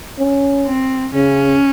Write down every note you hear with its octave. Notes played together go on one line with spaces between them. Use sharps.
C#4
C4
C#3 C#4